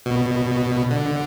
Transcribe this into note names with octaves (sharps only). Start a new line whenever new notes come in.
B2
D3